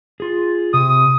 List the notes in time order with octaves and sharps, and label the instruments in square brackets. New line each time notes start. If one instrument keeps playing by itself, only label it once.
[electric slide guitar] F4 G#4
[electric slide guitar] C3 [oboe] D#6